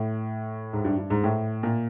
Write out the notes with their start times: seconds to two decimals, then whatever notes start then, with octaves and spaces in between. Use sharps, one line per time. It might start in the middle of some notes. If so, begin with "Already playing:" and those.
Already playing: A2
0.73 G#2
0.84 G2
0.98 G2
1.10 G#2
1.24 A2
1.63 A#2